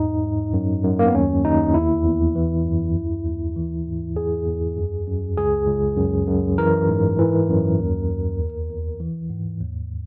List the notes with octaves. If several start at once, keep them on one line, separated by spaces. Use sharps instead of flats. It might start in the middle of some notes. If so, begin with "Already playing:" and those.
Already playing: E2 G#2 D#4
G#2
F#2
F#2
A#3
B3
D#2 C#4
D#2 D#4
E2 E4
E2
E3
F#2
D#2
D#2
E3
G#2
E2 G#4
E2
F#2
F#2
C#2 G#4
C#2
F#2
F#2
E3 A#4
G#2
E3
F#2
D#2
D#2
E2
E2
E3
G#2
D#2